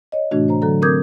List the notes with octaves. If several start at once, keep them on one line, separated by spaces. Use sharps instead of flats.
C#5 D#5
A2 C3 E3 A3 D4 F#4
C5 A#5
D3 F#3 A4 A#5
C4 A#4 D6 D#6 G6 G#6